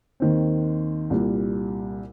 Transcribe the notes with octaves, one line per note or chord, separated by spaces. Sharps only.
D#2 D#3 C4
C2 A#2 G3